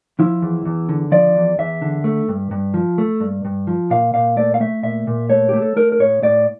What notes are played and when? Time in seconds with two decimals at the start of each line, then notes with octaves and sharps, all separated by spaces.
0.19 F3 E4
0.42 E2
0.65 E2
0.89 D3
1.12 F3 D5
1.35 E2
1.59 E2 E5
1.82 D3
2.04 A3
2.28 G2
2.51 G2
2.74 F3
2.98 A3
3.20 G2
3.45 G2
3.67 F3
3.90 A#2 F5
4.14 A#2 F5
4.37 A3 D5
4.54 F5
4.60 A3 E5
4.83 A#2 E5
5.07 A#2
5.30 A3 C#5
5.49 A3 G4
5.62 A4
5.76 A3 A#4
5.92 A#4
5.99 A2 C#5
6.23 A2 D5